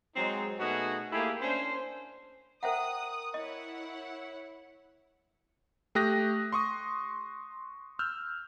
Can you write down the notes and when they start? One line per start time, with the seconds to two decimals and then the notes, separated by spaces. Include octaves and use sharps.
0.16 F#3 G#3 C4 D#4
0.59 B2 A3 D#4 F#4 G#4
1.11 A3 A#3 E4 G4 G#4
1.41 C#4 D4 C5
2.63 A#4 C5 E5 F#5 G5 A#5 D#6 F#6
3.34 E4 C#5 D#5 F#5
5.95 A3 G4 D#6 F#6 A#6
6.52 C6 C#6 D#6
7.99 E6 F6 G6